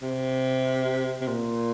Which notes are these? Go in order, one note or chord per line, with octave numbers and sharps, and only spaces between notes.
C3
C3
A#2